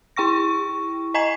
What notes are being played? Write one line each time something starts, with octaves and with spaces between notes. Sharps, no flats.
E4 G5 C#6 A#6
D#5 G#5 A#5 G#6 C7